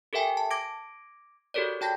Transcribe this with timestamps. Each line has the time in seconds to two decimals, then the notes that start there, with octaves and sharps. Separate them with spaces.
0.13 G4 A4 A#4 E5 G5 G#5
0.37 A5
0.51 D6 G#6 A#6 D7
1.54 F#4 G4 A4 A#4 C#5 D5
1.81 F#4 G5 A5 A#6